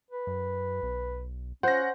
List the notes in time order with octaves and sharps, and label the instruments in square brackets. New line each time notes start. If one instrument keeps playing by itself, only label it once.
[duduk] B4
[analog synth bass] F#2
B1
[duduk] C#4 [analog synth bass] F4 [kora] C5 [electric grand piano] F#5 A#6